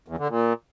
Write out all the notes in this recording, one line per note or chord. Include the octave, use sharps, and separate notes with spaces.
E2
D3
A#2